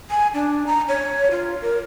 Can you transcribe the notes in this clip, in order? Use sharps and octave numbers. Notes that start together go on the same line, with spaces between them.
G#5
D4
A#5
C#5
F4
A#4